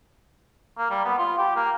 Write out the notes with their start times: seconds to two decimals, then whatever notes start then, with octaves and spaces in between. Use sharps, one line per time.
0.78 A#3
0.90 G3
1.05 B3
1.18 F4
1.38 G4
1.56 A#3